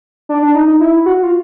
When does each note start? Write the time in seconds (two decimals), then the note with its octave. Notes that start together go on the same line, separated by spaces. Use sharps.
0.29 D4
0.42 D4
0.55 D#4
0.68 D#4
0.80 E4
1.06 F#4
1.23 F4